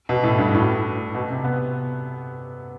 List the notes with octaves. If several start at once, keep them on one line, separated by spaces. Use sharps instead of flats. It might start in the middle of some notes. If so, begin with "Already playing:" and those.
B2
A2
G2
A2
B2
C3
B3